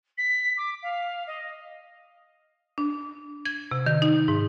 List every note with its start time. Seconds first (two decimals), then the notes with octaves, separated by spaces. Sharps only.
0.17 B6
0.57 D6
0.83 F5
1.27 D#5
2.78 D4
3.45 G#6
3.71 C3
3.86 D#3
4.02 D#4
4.28 G#2